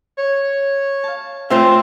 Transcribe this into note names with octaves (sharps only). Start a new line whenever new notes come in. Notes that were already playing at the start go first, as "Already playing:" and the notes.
C#5
F5 A5
A3 C4 F4 C5 E5 A5